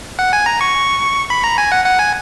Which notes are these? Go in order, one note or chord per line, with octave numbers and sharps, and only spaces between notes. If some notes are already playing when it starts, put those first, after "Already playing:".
F#5
G#5
A#5
C#6
B5
A#5
G#5
F#5
F#5
G#5